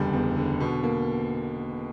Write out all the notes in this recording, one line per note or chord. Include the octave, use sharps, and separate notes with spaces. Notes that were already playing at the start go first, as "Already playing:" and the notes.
Already playing: F#1 E2 D3 G3
E2
D3
B2
A#3